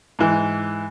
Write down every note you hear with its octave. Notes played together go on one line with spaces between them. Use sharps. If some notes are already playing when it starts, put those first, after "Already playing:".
G#2 E3